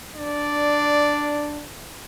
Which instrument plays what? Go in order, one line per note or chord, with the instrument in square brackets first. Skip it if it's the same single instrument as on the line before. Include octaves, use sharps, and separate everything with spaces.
[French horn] D4 [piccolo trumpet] D5